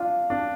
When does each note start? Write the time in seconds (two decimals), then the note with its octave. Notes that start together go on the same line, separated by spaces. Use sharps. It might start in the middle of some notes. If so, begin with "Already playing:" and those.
Already playing: D4 F4
0.30 D4